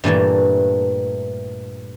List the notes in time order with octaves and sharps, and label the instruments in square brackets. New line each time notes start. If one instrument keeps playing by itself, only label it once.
[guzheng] G2 A#2 E3 A3